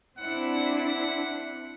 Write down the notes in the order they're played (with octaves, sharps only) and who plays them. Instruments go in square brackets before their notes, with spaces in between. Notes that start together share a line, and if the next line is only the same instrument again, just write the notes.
[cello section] C4 D4 E4 [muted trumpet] F#5